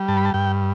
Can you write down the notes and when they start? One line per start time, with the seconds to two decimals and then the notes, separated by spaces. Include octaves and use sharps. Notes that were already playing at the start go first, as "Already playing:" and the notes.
Already playing: G3
0.08 G2 A5
0.17 B5
0.25 A5
0.34 G2 G5